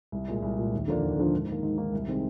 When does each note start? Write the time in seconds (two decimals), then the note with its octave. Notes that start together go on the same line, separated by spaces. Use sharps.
0.12 C2
0.28 A#2 G#3
0.43 C2
0.58 A#2 G#3
0.73 D#2
0.88 D3 F3 A#3 D4
1.03 D#2
1.18 D3 F3 A#3 D4
1.33 G#2
1.48 D#3 A#3
1.63 G#2
1.78 D#3 A#3
1.93 C2
2.08 C3 D#3 G#3 C4